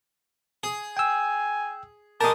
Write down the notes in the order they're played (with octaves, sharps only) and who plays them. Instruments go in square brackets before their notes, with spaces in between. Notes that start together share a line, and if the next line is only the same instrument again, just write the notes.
[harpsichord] G#4
[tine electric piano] G5 E6 [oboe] G#5
[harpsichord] G#3 A#4 [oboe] G4 [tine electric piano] A5 D#6